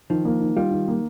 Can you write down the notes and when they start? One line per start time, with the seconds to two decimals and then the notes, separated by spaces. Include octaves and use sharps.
0.10 D#3 F3
0.25 A#3
0.40 D#3
0.56 G3 F4
0.71 D#3
0.88 A#3